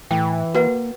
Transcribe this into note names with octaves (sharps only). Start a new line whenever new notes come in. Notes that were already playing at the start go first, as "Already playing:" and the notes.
A2 E3 G5
A#3 F#4 B4 F#5